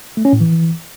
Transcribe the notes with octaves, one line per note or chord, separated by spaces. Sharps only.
A3
C#4
A2
E3